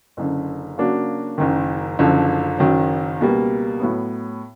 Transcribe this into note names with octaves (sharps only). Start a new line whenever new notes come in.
F#1 F#2 D3
C#3 F#3 A#3 D4 F#4
F#1 F#2 D#3
F#1 F#2 D3 F3
F#1 F#2 D#3 F#3
C#2 B2 G3 A#3
A2 F#3 B3